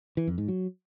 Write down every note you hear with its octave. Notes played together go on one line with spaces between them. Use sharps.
E3
F2
G#2
F#3